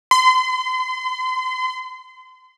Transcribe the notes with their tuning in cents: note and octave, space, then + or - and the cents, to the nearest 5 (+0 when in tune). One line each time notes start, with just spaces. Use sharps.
C6 -35